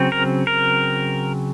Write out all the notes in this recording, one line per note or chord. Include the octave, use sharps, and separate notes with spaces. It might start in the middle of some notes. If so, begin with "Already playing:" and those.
Already playing: C#3 F#3 C4
A#4
A#4